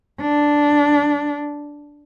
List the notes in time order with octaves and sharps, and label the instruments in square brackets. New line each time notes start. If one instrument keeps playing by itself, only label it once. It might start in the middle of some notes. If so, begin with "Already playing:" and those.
[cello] D4